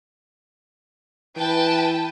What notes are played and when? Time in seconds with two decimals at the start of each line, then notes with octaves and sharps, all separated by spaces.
1.37 E3 B4 G5 A5